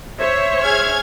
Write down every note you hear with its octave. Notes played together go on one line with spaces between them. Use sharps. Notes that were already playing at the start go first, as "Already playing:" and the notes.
C5 C#5 E5
G#4 F6 G#6